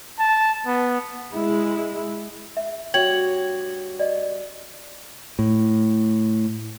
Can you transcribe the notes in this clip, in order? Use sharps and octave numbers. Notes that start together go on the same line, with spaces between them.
A5
B3
G#3 E4
E5
G2 F#4 C#5 G5 G#6 F#7
D5 D#5
A2